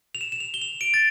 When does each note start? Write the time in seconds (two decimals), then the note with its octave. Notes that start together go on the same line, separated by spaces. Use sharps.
0.15 F7
0.21 E7
0.32 E7
0.40 F7
0.54 G7
0.62 F7
0.81 D7
0.94 A6